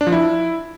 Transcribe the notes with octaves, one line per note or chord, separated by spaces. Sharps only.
D4
F3
E4